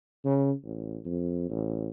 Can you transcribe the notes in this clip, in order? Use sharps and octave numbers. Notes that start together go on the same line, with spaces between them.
C#3
A1
F2
A1